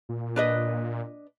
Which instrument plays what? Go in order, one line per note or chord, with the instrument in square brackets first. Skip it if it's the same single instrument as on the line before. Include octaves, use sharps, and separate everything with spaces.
[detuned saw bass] A#2
[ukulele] D4 B4 D#5